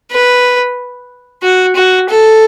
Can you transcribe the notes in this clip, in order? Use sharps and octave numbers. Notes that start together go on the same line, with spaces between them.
B4
F#4
F#4
A4